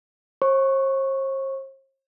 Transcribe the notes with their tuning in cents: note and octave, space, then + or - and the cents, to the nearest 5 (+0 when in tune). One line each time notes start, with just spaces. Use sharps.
C5 +45 C#6 -10